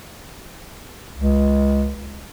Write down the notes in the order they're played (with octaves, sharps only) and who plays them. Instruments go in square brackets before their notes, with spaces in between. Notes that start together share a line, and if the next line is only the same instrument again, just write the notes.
[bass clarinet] C#2